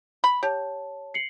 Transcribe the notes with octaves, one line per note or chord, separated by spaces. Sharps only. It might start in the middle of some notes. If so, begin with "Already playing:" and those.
B5
G4 C#5 A5
C7 C#7 F#7